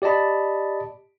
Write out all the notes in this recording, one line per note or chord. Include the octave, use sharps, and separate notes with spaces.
G4 D5 D#5 A5 B5